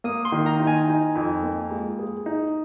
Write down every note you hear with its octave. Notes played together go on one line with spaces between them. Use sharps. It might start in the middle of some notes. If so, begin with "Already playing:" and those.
A#3 D#6
C6
D#3
A#5
D#4
G#5
D#4
F2
A#3
G#3
G#4
D#4